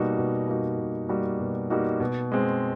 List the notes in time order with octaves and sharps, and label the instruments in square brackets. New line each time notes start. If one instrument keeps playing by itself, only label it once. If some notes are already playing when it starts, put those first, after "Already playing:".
Already playing: [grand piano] B2 G3 A#3 D#4 F#4
B2
G3 A#3 D#4 F#4
B2
G3 A#3 D#4 F#4
B2
G3 A#3 D#4 F#4
B2
G#3 C4